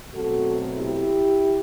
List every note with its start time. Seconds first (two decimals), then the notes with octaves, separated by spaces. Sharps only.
0.14 B2 F#3 A3 C4 F#4 A4
0.77 E4 G4